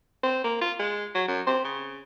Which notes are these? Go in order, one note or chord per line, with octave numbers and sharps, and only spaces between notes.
C4
A#3
F4
G#3
F#3
F#2
C4
C#3